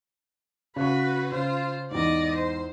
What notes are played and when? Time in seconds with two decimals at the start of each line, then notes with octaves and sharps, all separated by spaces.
0.76 C#3 F#4 B4 C#6
1.32 C#3 F4 C5
1.91 E2 G#2 D5 D#5
2.35 C5